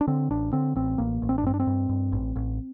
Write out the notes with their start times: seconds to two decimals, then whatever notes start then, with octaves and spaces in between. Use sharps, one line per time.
0.01 D4
0.07 D3 C4
0.30 A1 D4
0.53 D3 C4
0.76 A1 C4
0.98 A1 A#3
1.22 A1
1.29 C4
1.38 D4
1.44 G2 C4
1.54 D4
1.60 C4
1.67 G2
1.89 G2
2.12 A1
2.36 A1